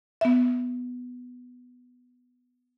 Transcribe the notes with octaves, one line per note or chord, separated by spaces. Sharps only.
B3 E5